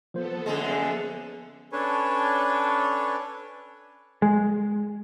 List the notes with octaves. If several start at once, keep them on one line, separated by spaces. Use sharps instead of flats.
F3 A#3 B3 A4 C5
F#2 D3 G#3
C#4 D4 A4 B4 C#5
G#3